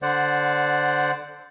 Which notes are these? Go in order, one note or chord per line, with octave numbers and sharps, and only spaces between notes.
D3 C5 D5 F#5